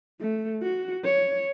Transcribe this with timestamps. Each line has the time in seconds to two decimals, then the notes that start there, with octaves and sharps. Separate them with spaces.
0.21 A3
0.63 F#4
1.05 C#5